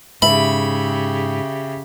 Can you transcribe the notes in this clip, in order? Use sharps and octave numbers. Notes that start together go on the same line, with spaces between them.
G#2 C#3 G4 E5 B5